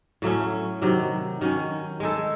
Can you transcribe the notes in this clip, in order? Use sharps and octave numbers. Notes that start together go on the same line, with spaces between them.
A2 F#3 A3 C#4
C3 D#3 F#3
D#3 F#3 C#4
G#3 D#4 A4